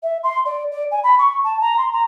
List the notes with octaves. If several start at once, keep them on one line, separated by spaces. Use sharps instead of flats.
E5
C6
D5
D5
G#5
B5
C#6
A5
A#5
C6
A#5